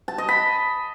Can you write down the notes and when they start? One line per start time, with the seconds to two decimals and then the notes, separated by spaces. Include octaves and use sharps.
0.08 A5
0.18 D#5
0.29 B5